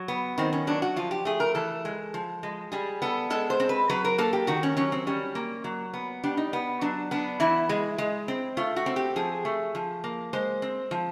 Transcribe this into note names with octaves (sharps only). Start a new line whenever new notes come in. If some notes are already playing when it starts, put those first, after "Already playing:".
Already playing: F#3
B3
D#3 C4
C#4
F#3 D4
F#4
F3 F4
G4
A3 G#4
A#4
E3 A4
G#3
F3
G#3
G3 G#4
B3 A4
G#3 A4
C5
C4
B4
F#3 B4
A#4
A#3 A4
G4
D#3 F#4
C#4
F#3 C#4
C4
G3 C#4
A#3
F#3
B3
G3 D4
D#4
B3
F#3 D4
B3 D4
E3 E4
G#3
G#3
C4
A3 F4
F#4
C4
G4
F3 G#4
A3
F3
A#3
G#3 C5
C4
F3